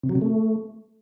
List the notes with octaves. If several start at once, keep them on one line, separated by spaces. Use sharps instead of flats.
C3
F#3
C3
A3